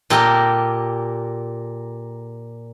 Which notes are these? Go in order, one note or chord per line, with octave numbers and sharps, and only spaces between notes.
A#2 G4 A4 A#4 A#5